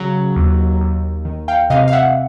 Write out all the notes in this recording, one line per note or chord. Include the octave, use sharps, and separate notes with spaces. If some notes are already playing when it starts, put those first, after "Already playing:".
Already playing: C#3 F#3
D#2
D#2
D#3
F5 G5
C3 D#5 F5
F5
E5 F#5